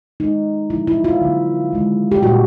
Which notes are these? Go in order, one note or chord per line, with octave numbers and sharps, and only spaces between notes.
D#3 G#3 D#4
D3 F3 A3 E4
E4
F4
D3 F#3 A#3
D#3 G#3
G4
A#2 G3 A#3 F#4